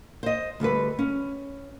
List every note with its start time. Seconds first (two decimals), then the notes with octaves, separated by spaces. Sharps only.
0.23 C5 D#5
0.60 D2 G3 A4 B4
0.99 C#4